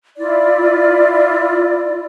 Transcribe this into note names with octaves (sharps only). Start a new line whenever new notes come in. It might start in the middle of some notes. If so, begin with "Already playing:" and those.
E4 F4 D5